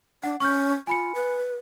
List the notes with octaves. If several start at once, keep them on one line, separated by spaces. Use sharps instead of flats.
D4 F#5
C#4 C#6 F6 G6
F4 G#5 B5 C#7
B4